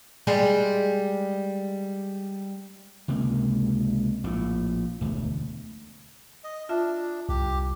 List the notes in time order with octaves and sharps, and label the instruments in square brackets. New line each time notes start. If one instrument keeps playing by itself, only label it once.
[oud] G3 G#3 G#4
[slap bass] C#2 C3 A#3
A#1 A2
E1 D2
[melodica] D#5
[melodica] D4 [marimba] F4 E5
[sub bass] C2 [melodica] G4